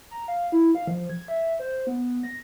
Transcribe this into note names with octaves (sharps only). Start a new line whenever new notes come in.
A#5
F5
E4
F5
F3
G#6
E5
C5
B3
A#6